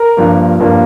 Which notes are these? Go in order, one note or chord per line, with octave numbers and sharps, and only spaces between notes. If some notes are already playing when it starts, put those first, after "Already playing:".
Already playing: A#4
G2 F3 A#3
G2 F3 A#3